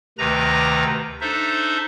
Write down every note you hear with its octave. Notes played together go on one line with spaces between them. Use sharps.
D2 C3 D#3 B4 A#5 A#6
D4 D#4 A4 C5 E5